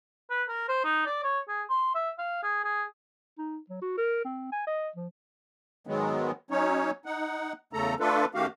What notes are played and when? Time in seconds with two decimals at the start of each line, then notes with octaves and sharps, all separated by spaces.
0.30 B4
0.49 A#4
0.68 C5
0.84 D#4
1.06 D5
1.24 C#5
1.49 G#4
1.70 C6
1.95 E5
2.19 F5
2.43 G#4
2.64 G#4
3.38 D#4
3.70 F#3
3.82 F#4
3.97 A#4
4.25 C4
4.52 G#5
4.67 D#5
4.96 F3
5.87 G#2 D#3 F#3 G#3 B3
6.51 F#3 C#4 D#4 C#5
7.06 D#4 F#5
7.73 E2 C#3 A3 A4 A#5
8.00 A3 D4 F4 A4 B4
8.35 F#2 D#3 A3 F#4 G4 F5